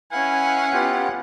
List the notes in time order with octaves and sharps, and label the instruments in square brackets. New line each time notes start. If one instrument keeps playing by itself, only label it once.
[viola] C#4 F#5 [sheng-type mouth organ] E4 B4 F5 [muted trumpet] G#5
[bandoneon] B3 F4 G4